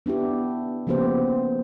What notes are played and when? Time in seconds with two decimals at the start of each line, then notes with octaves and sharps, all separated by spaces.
0.06 B3 D4 E4 G4
0.87 C#3 F3 A#3 B3 G4 C5